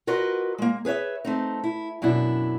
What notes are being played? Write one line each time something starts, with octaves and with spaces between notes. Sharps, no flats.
F4 F#4 A#4 B4 D#5
G#3 A#3
G#4 B4 C#5 E5
A3 C4 D#4
E4
F#2 B2 D4 E4